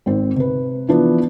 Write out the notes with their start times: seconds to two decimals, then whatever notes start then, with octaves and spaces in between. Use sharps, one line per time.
0.06 G#1 C4
0.36 C3 B4
0.89 E3 F3 B3 D4 B4